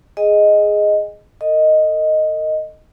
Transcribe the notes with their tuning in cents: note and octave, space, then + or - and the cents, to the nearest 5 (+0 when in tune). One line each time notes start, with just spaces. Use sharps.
G#4 +0 D#5 +0 G#5 -35
A4 +40 D#5 +0